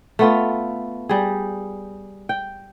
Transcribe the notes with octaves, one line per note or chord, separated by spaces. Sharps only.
A3 B3 F4
G3 G#4
G5